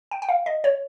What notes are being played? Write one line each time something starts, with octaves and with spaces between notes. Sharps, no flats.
G5
G5
F5
D#5
C#5